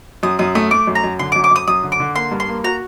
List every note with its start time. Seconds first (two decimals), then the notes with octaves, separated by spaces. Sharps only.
0.23 F#2 D#6
0.39 F#2 D#6
0.55 A3 D#6
0.71 A3 D6
0.87 F#2
0.95 A#5
1.04 F#2
1.19 D3 C6
1.32 D6
1.36 F#2
1.44 D6
1.51 F#2 D#6
1.67 F#2 D#6
1.83 D3
1.92 D6
2.00 D3
2.15 A#3 C6
2.31 G2
2.40 C6
2.48 A#3
2.64 F#4 A#5